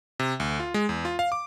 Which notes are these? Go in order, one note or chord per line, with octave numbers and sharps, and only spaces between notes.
C3
D2
F4
G#3
E2
F4
F5
D6